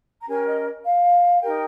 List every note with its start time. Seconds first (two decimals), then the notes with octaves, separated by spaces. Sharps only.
0.20 A#5
0.26 C#4 G4 A#4 G#5
0.46 D#5
0.84 F5
1.42 D#4 G4 A#4 G5